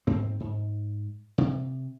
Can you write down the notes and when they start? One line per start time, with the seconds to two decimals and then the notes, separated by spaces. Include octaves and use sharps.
0.07 G#2 C4
0.40 G#2
1.38 C3